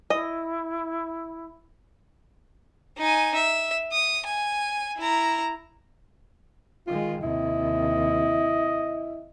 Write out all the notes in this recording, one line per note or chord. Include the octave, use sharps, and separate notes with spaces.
E4 D#5
D#4 G#5
E5
D#6
G#5
E4 A#5
D#3 G#3 F4
D#2 C3 E4 D#5